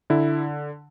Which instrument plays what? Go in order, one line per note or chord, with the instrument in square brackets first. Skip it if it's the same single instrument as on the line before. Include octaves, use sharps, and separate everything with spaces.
[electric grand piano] D3 E4